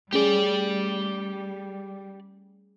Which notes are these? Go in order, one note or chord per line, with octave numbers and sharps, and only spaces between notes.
G3 A3 C#4 G4 G#4 D5